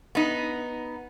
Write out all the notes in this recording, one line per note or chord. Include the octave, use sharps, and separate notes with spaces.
B3 D#4